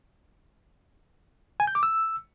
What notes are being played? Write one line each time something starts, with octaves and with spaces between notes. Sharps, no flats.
G#5
G6
D6
E6